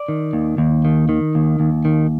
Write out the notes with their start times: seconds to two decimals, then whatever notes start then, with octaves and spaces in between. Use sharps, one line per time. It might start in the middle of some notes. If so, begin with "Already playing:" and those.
Already playing: D5
0.08 D#3
0.33 D#2
0.58 D#2
0.85 D#3
1.09 D#3
1.35 D#2
1.60 D#2
1.85 D#3